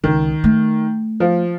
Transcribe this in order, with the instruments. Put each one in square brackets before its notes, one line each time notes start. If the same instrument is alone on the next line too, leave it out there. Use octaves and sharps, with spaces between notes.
[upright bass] C#2 [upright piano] D#3
[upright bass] A3
[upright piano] F3